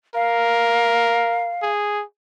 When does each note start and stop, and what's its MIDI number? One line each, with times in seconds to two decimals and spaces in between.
0.15 1.55 70
0.15 1.70 77
1.63 2.04 68